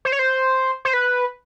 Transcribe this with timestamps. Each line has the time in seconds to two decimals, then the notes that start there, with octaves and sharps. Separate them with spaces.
0.05 C5
0.12 C#5
0.19 C5
0.85 C5
0.94 B4